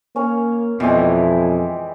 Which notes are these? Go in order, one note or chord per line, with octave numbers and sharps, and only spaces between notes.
A#3 C#4 C#5
F2 B2 E3 G#3 E4 D5 G5